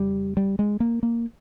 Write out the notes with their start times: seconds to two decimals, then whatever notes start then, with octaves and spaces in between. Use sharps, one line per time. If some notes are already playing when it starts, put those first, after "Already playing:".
Already playing: F2 C#3 G3
0.37 G3
0.59 G#3
0.80 A#3
1.03 A#3